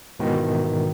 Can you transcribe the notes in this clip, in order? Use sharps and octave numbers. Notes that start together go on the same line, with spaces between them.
G#2 B2 D#3 E3